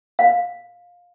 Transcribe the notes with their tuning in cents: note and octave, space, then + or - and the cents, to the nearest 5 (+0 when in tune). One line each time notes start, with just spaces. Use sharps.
F5 +15